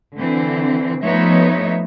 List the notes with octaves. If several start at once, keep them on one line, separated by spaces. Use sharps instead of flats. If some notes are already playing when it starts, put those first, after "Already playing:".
D3 E3 C4
F3 A3 B3 D#4 C#5 E5